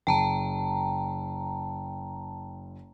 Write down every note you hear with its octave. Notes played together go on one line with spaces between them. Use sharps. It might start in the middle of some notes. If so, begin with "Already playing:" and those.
F#1 G5 A5 A#5